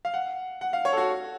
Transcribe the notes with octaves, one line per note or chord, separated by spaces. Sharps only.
F5
F#5
F#5
F5
C#5
A4
F#4